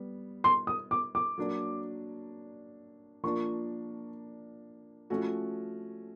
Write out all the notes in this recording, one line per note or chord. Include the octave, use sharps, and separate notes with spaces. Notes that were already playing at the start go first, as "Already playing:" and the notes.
Already playing: G3 B3
C6
D#6
D6
D6
F#3 A#3 D4
F3 A#3 D4 F4 C#6
F3 A3 C#4 F#4